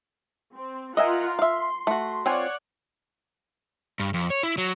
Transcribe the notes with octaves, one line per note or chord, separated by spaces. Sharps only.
C4
F4 A#4 D#5 E5 F#5 G#5
E5 F5 C6
A3 F#4
C4 F4 C#5 D5 F#5 G#5
G2
F2
C#5
E4
F#3